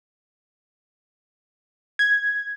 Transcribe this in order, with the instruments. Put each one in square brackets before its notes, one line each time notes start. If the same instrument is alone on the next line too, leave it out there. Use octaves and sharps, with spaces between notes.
[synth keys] G#6